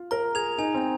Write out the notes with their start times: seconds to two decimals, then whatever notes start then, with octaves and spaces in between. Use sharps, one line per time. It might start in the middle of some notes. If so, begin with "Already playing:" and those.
Already playing: F4
0.11 A#4 A#5
0.35 G#4 G#6 F7
0.58 D#4 G#5
0.74 C4